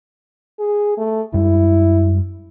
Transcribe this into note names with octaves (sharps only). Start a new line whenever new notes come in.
G#4
A3
F#2 G3 E4